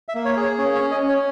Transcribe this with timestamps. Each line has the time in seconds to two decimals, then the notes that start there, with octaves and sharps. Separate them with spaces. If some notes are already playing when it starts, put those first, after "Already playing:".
0.08 E5
0.15 A#3
0.25 C#5
0.37 G#4 C#5
0.58 C#4 C#5
0.75 C#5
0.81 C#4
0.91 D#5
1.03 C#4
1.09 C#5